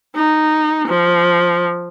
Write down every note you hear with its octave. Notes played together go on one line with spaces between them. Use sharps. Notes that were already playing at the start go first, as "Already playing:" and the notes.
D#4
F3